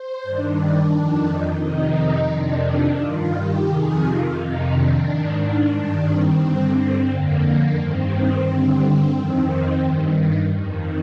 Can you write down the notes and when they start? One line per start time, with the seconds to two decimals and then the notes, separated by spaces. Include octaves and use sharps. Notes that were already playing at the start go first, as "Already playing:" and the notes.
Already playing: C5
0.23 G2 D#3 D4
0.92 F2 D#3
1.27 D#4
1.61 F2 C3 D#3 D#4
2.29 F2 C3 D#3 D4
2.98 G2 D#3 F4
3.33 G4
3.66 F2 C3 D#3 G#4
4.00 F4
4.34 F2 C3 D#3 D#4
4.68 D4
5.03 G#2 D#3
5.72 G2 D#3
6.05 C4
6.40 G2 D3
6.74 C4
7.09 F2 D3 A#3
7.77 G2 D#3 C4
8.45 G2 D3
8.79 C4
9.14 F2 D#3 C4
9.49 C4
9.83 G2 D#3
10.51 F2 D#3